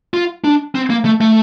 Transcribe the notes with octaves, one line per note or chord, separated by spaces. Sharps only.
F4
D4
C4
A#3
A3
A3